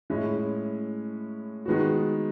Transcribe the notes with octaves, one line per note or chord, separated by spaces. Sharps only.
A2 G#3 C#4 E4
D#3 G#3 B3 F#4